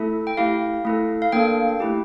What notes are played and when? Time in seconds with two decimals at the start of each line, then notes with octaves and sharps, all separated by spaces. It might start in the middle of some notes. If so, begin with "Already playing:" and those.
Already playing: A3 E4 A4 E5
0.27 G5
0.37 A3 E4 G4 F5
0.85 A3 E4 A4
1.22 F5
1.32 A#3 D4 A4 G5
1.80 A3 E4 G4